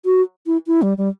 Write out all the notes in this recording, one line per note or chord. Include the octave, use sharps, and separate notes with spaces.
F#4
E4
E4
G3
G3